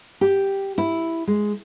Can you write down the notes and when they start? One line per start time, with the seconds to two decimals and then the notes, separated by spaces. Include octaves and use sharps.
0.21 G4
0.78 E4
1.27 G#3